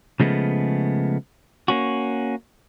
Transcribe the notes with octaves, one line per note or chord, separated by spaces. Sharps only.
C#3 F3 G#3 A3 B3
A#3 C#4 F#4